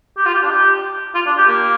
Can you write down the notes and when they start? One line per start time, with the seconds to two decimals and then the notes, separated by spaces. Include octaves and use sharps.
0.17 G4
0.26 F4
0.34 G4
0.43 D4
0.50 G4
1.15 F4
1.26 D4
1.38 G4
1.48 A#3